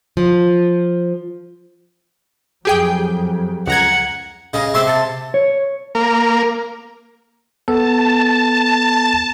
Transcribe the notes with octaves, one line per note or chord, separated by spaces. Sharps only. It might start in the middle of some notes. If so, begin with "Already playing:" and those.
F3
F2 F#3 G4 G#4 G5
C#2 F#5 A#5 G#6
C#3 G#4 D#5
C3 C6 D6 E6
A5
C#5
A#3
B3 A4 A5